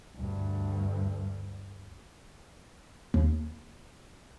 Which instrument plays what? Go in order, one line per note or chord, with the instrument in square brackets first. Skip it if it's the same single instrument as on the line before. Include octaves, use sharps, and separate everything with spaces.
[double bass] D2 G2
[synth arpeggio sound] D#2